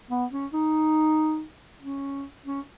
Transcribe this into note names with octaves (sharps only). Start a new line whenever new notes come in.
B3
C#4
D#4
C#4
C#4